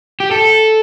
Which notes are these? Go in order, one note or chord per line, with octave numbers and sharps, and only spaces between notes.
G4
A4